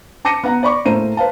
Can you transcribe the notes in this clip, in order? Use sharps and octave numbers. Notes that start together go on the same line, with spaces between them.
A5 D6 A#6 C#7 D#7
B3 F#5 A#5
D5 B5 C#6 D6
A2 A#3 C5 A#5 D#7
B4 C5 F5 A5